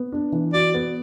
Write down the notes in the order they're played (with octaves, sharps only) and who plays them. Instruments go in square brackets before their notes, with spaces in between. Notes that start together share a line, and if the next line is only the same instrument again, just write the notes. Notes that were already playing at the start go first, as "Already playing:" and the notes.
Already playing: [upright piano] B3
D4
E3
[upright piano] F#4 [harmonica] D5
[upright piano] B3